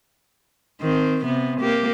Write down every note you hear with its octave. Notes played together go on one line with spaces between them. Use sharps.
D#3 C4
C3 B3
A#3 G4